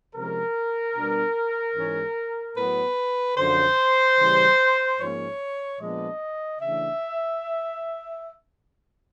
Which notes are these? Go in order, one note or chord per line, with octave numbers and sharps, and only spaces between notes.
C3 F3 G#3 C#4 A#4
B2 G3 B3 D4
G#2 E3 G#3 C#4
A2 F#3 B3 B4
F#2 D3 F3 C5
C#3 E3 G3
G#2 F3 A#3 C#4 C#5
A#2 F3 G#3 B3 D4 D#5
C#3 E3 A3 D4 E5